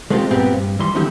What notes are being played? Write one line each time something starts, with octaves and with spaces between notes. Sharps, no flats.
G#3 A3 C4 E4 F4 G4
G2 A#2 B3 C4 G4
G2
D#2 E3 G3 C6
D3 D#3 F#3 D#4 E4 G4